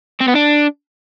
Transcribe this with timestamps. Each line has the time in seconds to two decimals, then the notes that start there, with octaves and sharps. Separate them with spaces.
0.21 C4
0.28 B3
0.35 D4